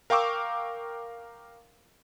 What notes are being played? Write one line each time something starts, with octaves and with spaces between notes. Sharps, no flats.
A#4 F5 G5 C#6 D6 E6